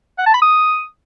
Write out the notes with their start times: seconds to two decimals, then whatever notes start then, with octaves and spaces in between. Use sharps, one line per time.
0.18 F#5
0.26 A5
0.34 B5
0.42 D#6